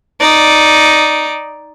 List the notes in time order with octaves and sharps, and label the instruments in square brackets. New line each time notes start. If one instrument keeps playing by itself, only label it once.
[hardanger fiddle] D#4 D5